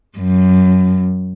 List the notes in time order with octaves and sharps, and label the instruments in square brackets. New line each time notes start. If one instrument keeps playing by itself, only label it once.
[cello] F#2